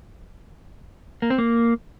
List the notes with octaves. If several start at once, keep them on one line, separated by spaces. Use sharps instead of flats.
A#3
C4
A#3